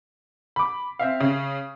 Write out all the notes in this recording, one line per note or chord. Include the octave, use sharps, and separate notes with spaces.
B5 D6
C4 E5 F5
C#3